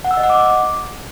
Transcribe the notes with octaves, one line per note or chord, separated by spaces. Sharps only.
F#5
E6
D#5
F#5
D6